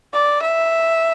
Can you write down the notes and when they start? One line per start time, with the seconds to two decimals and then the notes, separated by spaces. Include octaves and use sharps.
0.14 D5
0.42 E5